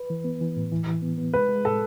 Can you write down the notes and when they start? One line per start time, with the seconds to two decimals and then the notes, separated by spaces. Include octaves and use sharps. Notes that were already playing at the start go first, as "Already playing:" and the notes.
Already playing: B4
0.10 E3
0.24 B3
0.41 E3
0.56 A2
0.72 E3
0.87 E3
1.02 B3
1.18 B3
1.34 G#3 B4
1.49 G#3
1.65 A2 A4